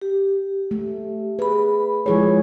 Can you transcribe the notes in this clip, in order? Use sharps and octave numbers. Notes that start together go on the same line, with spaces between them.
G4
A3
G#4 B4 B5
F3 G#3 E4 G#4 C#5